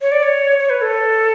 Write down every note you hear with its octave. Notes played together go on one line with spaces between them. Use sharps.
C#5
D5
C#5
C#5
B4
A4